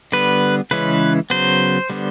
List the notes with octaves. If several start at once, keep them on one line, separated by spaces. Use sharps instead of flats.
D3 G3 B3 B4
C#3 E3 G#3 C#4 B4
C#3 F#3 B3 C5
D3 G3 B3